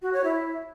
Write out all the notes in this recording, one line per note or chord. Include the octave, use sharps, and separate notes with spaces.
F#4
C#5
E4